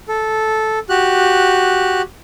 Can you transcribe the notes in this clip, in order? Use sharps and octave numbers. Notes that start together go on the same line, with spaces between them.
A4
F#4 G4 F#6